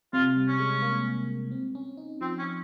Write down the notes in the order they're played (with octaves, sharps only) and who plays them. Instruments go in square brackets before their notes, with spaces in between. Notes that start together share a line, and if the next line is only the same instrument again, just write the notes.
[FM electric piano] C3 [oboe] F4
[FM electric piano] G3
[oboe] C#4
[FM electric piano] G#3
A#3
C4
C#4
D#4
[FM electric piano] F3 [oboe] C4
[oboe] C#4